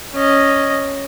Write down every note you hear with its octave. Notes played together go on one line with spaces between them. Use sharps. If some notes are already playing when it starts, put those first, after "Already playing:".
C#4 D#5